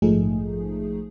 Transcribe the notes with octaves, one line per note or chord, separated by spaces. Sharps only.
A#1 G#2 F3 A3 D#4 G#4